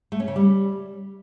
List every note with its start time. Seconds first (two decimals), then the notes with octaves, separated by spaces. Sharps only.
0.12 A3
0.20 C#4
0.28 C#3
0.36 G3